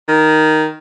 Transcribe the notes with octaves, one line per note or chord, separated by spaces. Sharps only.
D#3